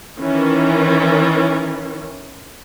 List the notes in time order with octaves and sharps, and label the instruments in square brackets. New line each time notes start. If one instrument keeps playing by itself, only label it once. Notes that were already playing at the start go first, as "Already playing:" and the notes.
[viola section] D#3 E3 C#4